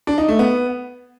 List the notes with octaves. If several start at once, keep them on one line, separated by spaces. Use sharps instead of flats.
D4
D#4
A3
B3